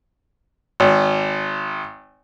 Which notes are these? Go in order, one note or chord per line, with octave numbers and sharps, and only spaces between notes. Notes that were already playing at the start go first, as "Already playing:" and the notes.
G#1